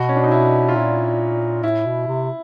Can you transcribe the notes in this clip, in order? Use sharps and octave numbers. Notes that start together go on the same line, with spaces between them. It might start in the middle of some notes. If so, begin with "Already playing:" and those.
Already playing: B2 F#4
C#4
D4
D#4
E4
F4
A#2 E4
A2 E4
B2
C3